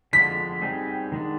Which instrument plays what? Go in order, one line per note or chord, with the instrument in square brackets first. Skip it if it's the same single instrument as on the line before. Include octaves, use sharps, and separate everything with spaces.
[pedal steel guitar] D3 F3 G#3 D4 [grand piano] B6
[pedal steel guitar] G3 C4 D#4 G#4
D#3 G#3 D4